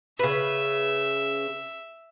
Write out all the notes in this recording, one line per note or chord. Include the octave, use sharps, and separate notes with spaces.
C#3 B4 E5